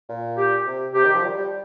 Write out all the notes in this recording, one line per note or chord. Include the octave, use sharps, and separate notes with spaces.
A#2
G4
C3
C3 G4
D#3
F3
G3
G3